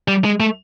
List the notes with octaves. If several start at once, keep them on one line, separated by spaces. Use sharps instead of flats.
G3
G#3
A3